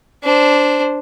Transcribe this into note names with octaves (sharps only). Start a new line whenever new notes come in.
D4 C5